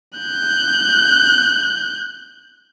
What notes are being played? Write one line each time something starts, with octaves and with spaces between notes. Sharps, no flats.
F#6 G6